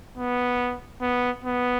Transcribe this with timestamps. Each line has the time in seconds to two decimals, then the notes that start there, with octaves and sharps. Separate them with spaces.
0.17 B3
1.02 B3
1.44 B3